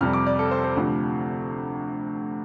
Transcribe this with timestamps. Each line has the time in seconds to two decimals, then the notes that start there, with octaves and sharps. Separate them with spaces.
0.01 F2 C3 G3 F6
0.13 D6
0.26 D5
0.39 A4
0.51 C5
0.64 C5
0.76 D2 C3 F3